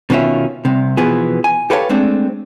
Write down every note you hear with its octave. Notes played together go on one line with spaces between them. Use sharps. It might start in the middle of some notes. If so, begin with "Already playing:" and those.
B2 D#3 A#3 C#4 F4 E5
C2 C3
B2 E3 F3 B3 G#4
G#5
G4 A4 B4 C#5 E5 F5
G#3 A3 C4 D4